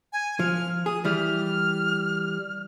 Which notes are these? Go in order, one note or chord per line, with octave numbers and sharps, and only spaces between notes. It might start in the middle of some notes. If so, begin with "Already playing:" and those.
G#5
F3 F6
G#4 D#6
E3 G3 F6